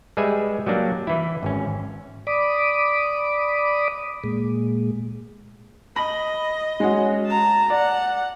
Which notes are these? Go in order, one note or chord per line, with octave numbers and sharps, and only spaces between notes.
G3 G#3 G#4 B4 E5 G#5
F#3 G3 A#3 D4
E3 E4
G#1 C#4
D5 B5 D6 D#6
A#2 G#3
D#5 B5 A#6 F#7
G#3 C#4 F#4
A5 A#5
D5 F#5